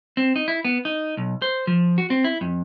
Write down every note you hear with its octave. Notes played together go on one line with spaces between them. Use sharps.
C4
D#4
E4
B3
D#4
B1
C5
F3
F#4
C4
E4
F2